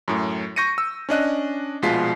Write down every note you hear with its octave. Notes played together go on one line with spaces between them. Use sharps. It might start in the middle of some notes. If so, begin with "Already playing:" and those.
F#2 A2
C#6 G6 A#6 C#7 D#7
E6
C#4 D4 D#5 F#6
A#1 B2 G#3 F4 B6 C7